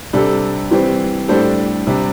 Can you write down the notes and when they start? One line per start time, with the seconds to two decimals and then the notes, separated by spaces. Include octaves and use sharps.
0.13 C3 G3 D4 A4
0.71 E3 G3 C4
1.28 A2 G3 D4 A4 C5
1.87 C3 G3 D4